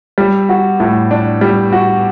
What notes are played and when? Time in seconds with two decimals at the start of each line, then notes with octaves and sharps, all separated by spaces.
0.18 G3
0.49 F#4
0.80 A2
1.11 D4
1.41 G3
1.72 F#4